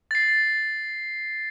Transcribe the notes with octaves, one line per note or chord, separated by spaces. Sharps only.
A6 C7